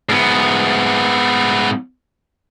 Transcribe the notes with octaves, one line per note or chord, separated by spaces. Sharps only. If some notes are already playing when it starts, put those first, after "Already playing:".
G#2 B3